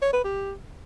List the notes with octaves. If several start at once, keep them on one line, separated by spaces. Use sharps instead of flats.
C#5
B4
G4